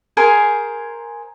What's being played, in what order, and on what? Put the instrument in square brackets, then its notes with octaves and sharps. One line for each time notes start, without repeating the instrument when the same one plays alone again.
[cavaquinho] G#4 A#4 C5 G#5